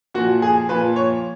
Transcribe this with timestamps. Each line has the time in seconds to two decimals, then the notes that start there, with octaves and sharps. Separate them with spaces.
0.14 A#2 F3 F#4
0.42 G#4
0.69 A#2 F3 B4
0.96 C#5